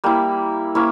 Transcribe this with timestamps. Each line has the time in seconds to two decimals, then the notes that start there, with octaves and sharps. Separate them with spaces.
0.04 G3 A#3 E4
0.75 A#3 C#4 E4